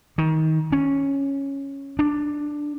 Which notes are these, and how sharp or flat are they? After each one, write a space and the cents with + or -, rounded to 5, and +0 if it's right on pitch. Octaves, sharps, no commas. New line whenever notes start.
D#3 +25
C#4 -5
D4 +5